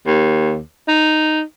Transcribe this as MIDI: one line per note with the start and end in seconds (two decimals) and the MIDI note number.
0.07 0.60 39
0.88 1.42 63